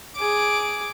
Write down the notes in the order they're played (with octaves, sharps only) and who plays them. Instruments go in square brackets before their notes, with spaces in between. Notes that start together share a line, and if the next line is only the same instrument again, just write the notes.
[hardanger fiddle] G#4 D6